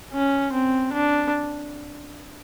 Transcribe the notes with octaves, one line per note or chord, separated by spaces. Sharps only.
C#4
C4
D4